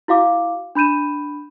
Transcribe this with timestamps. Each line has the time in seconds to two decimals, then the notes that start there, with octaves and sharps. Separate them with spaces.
0.08 E4 F#4 F5 D6
0.75 D4 B5 G6 D#7 E7